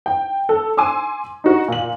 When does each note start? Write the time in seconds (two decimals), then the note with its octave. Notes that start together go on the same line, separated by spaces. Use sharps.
0.06 G5
0.49 A4
0.77 G#5 C6 D6 E6
1.44 D#4 F#4
1.68 A#2 F#7